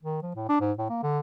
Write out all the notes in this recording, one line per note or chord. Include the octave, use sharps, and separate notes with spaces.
D#3
F3
A2
D4
G#2
A2
A#3
D3